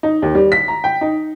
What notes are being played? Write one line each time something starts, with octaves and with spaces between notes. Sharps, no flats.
D#4
D#2
G3
B6
A#5
G5
D#4